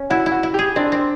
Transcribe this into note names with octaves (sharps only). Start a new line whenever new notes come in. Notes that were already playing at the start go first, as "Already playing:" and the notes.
Already playing: C#4
E4 F#4
E4
F#4
E4
G4 G#4
C4 D4
C4